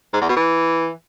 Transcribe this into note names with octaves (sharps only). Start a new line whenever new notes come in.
G#2
E2
B2
E3